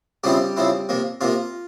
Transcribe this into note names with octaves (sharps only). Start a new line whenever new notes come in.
C#3 F3 G3 C4 E4 G4
C#3 F3 C4 E4
C3 F3 A#3
C3 F3 A#3 F4